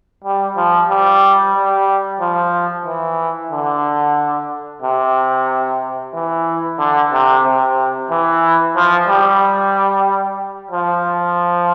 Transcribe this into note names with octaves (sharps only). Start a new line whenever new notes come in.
G3
F3
G3
G3
F3
E3
D3
C3
E3
D3
C3
C3
E3
F3
G3
F3